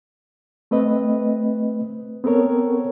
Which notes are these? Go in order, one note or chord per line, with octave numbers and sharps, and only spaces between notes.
A3 C4 B4 D#5
B3 C4 A4 A#4 C#5